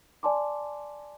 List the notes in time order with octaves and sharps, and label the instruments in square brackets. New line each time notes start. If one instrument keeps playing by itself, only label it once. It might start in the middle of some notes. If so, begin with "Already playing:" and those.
[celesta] D5 G#5 A5 C6 D6